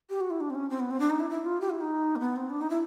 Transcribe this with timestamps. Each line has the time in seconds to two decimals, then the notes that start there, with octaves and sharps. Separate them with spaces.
0.09 G4
0.20 F#4
0.30 E4
0.40 D4
0.50 C4
0.54 C#4
0.69 C4
0.79 B3
0.90 C4
0.99 D4
1.10 D#4
1.19 E4
1.30 E4
1.45 F4
1.60 G4
1.70 E4
1.80 D#4
2.15 A#3
2.19 B3
2.36 C4
2.49 D4
2.61 D#4
2.69 E4